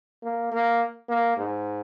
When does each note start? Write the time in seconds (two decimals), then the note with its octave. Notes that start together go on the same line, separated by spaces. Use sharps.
0.23 A#3
0.52 A#3
1.09 A#3
1.37 G#2